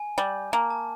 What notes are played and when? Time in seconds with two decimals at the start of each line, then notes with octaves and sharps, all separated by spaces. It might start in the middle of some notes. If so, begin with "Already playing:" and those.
Already playing: G#5
0.18 G3
0.52 A#3 A5
0.70 A5